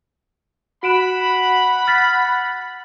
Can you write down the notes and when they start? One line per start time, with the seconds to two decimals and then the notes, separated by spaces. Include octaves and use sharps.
0.83 F#4 F#5 B5 D7 E7
1.87 F6 A6 B6